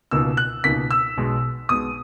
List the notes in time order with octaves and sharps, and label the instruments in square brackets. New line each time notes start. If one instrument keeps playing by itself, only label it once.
[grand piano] C#2 B2 A#3 D#4 E6
F#6
C#2 B2 A#3 D#4 B6
E6
B1 B2 G#3
B1 B2 G#3 D#6